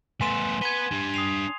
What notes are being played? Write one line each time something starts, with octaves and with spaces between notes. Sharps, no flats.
A3 B3 G#5 C6 E7
B4 F#5 G#6 D#7 G7
D4 G4
D#6 C7 F7